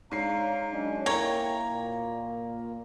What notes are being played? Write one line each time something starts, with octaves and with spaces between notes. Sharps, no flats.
G#2 D4 C#5 F5 A#5 C7
F#3 G#3 C#4 D4 D#5
A#3 E4 A#4 C#5 G5 A#5
A#2